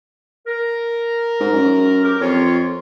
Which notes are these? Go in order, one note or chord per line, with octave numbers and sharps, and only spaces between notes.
A#4
G#2
F#2
G4 A#4
F2 F4 C#5